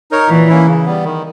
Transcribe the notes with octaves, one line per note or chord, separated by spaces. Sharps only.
D#4 A#4 C#5
A#2 E3
A#3 C#4 E4
C#3
G3 B3
D#3